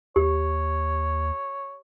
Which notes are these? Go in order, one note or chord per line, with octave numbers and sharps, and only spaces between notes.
D#2 G4 C#5